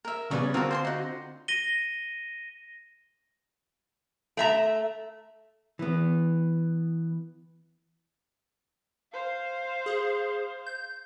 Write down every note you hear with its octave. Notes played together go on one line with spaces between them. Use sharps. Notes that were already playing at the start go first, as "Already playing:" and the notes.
A#4 E5
C#3 G3 B3 C#5 D5
D3 C4 F4 F#4 A#4
C5 G#5 C6
D#4 F#4
A#6 D#7 G7
A3 E5 A#5
E3 B3
C5 F5
G#4
G6